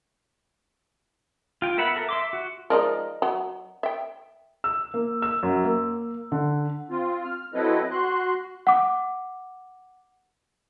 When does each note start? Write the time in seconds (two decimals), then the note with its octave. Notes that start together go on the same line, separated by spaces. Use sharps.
1.62 F4 G5
1.77 B3 A#4 E5 F#5 B5
1.96 A4 A#4
2.09 E5 C6 D6
2.33 F#4
2.70 F3 G#3 D#4 A#4 D5 D#5
3.22 F#3
3.83 E5 G5
4.64 E6
4.94 A#3
5.22 E6
5.43 F#2
5.65 A#3
6.32 D3
6.90 C4 F4
7.24 F6
7.54 F#3 C4 E4 A4 B4 D#5
7.91 F#4 C6 F#6
8.67 F#5 D6